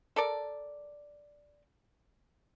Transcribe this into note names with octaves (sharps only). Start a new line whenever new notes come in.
A4 A#4 D5